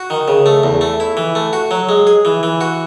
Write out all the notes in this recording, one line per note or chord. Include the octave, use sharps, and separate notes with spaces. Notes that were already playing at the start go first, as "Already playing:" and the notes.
Already playing: F#4
D#3
C#3
A3
E2
A3
E4
E3
A3
F#4
F#3
G#3
G#4
E3
E3
F#4